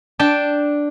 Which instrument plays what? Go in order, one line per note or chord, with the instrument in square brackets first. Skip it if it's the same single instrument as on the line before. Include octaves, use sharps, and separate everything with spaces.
[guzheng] D4 G5 A5